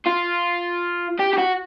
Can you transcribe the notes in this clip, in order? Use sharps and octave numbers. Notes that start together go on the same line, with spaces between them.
F4
G4
G4
F#4